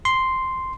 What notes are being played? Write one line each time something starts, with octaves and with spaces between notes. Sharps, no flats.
C6